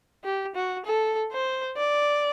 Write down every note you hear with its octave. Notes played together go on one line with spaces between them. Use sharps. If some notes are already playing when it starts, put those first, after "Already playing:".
G4
F#4
A4
C5
D5